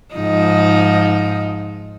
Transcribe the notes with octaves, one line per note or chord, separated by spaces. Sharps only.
G#2 F3 D#4